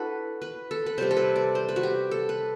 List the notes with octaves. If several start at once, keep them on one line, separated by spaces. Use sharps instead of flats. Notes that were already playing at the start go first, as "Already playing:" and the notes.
Already playing: D4 E4 F#4 A4 B4
B4
A4
B4
C3 G3 C4 C5
A4
B4
D5
C5
B4
F#4
G4
A4
B4